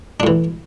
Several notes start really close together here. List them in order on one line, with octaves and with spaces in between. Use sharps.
D4 A2 E3